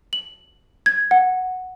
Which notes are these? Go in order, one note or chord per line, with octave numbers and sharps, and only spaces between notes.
F#7
G#6
F#5